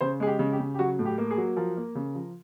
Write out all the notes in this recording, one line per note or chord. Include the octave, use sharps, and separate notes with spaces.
C#3 C5
G#3 G#4
G4
C#3
G4
C#3
G4
F#3 F#4
A2
G4
A#3
G#4
F#3
F3 A#4
A#3
C#3
F3